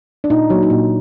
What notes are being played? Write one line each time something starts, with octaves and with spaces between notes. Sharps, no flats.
D4
A#2 D#4
F#3 A#3
D#4
A#2 D4